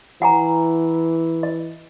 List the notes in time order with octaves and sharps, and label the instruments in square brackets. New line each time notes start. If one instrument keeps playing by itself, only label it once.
[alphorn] E3 [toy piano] F#5 G#5 A#5
[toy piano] D#5